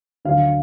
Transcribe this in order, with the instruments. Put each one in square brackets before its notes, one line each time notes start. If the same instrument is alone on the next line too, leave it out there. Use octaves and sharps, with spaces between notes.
[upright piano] D2 D3 F#3 F5